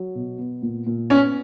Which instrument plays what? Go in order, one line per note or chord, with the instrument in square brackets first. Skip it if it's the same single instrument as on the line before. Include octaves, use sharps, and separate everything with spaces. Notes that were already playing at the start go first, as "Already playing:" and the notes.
Already playing: [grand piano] F#3
B2
B3
A#2
A#2
[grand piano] B3 [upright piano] C#4